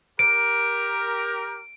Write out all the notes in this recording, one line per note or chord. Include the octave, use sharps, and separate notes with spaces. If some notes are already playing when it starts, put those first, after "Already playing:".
G4 A#4 D7